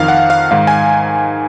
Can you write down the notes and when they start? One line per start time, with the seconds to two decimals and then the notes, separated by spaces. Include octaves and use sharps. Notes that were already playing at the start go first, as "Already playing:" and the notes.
Already playing: F2 D#3 F5
0.08 F#5
0.30 F5
0.51 G#2 D#3 F5
0.67 G#5